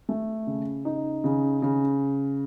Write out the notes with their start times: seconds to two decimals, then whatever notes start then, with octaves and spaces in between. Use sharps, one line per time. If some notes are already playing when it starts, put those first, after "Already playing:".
0.09 A3
0.47 C#3
0.85 D#4
1.24 C#3
1.62 C#3